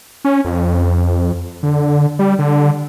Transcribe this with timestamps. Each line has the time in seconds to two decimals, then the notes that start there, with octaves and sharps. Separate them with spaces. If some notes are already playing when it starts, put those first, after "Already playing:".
0.25 C#4
0.45 F2
1.63 D3
2.19 G3
2.39 D3